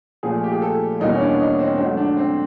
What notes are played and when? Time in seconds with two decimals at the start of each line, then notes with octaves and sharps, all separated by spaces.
0.23 A#2 F3 A3 G#4
0.44 G4
0.53 G#4
0.62 A4
1.00 E2 B2 G3 A#3 D#4
1.11 C#4
1.20 D4
1.40 D#4
1.59 C4
1.78 G#2 D#3 F#3 A3 C4
1.97 D4
2.17 C4